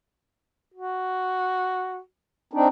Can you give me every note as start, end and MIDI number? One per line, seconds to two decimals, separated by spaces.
0.74 2.01 66
2.53 2.68 60
2.53 2.68 62
2.53 2.68 63